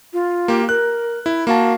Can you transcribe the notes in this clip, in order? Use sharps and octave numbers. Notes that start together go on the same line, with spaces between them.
F4
A#3 G4
A#4 F#6
E4
A#3 F#4 F5 A5